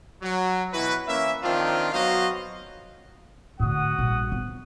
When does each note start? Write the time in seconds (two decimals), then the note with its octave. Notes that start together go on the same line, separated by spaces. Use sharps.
0.22 F#3
0.73 B2 E3 E4 F#4 B4
1.08 E3 A#3 C#4 E5
1.43 D#3 F3 C4 D4 F4
1.93 F#3 B3 F#4 C5 D#5 F5
3.60 A2 D3 F#4 F#5 D#6
3.99 A#1 G2
4.32 F3 B3